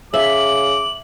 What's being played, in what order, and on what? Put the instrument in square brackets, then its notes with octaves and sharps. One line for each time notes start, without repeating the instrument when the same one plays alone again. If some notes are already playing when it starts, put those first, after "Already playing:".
[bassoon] C#3 [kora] E5 [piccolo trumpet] D6 [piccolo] F#7